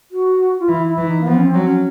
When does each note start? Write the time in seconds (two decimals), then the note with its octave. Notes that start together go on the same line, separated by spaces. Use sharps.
0.11 F#4
0.60 F4
0.68 E3 E4
0.88 E4
0.98 E3
1.07 D#4
1.21 A#3
1.27 F3 B3
1.36 C#4
1.45 C4
1.55 F#3
1.59 D4
1.65 C#4